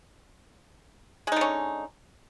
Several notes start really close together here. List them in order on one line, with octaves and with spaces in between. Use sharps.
G#3 D#4 D3 C#4